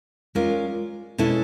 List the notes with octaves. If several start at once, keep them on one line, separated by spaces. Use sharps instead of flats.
G#3 C#4 F4 A#4 D5
B2 G#3 C#4 E4 A4